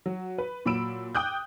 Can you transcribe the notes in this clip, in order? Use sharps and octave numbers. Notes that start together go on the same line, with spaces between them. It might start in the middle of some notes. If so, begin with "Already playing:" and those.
F#3 F#4
B4
A#2 F#3 B5 E6 D7 E7
G5 D6 D#6 F#6 G6